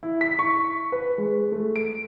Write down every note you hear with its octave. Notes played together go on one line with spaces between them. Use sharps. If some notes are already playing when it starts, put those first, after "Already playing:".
E4
B6
C#6
B4
G#3
A3
D7